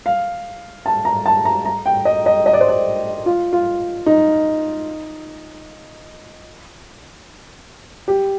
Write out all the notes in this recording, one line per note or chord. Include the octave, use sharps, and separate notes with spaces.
F5
A5
A#5
A5
A#5
A#5
G5
D#5
D#5
D#5
D5
C5
D5
F4
F4
D#4
G4